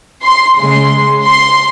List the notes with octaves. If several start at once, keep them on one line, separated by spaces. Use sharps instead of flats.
C6
C#3 G#3 C6
C6